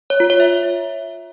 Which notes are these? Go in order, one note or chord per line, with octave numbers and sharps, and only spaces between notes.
C#5
F4
C#5
E5